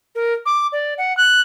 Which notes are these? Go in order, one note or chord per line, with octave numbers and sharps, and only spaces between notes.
A#4
D6
D5
F#5
F#6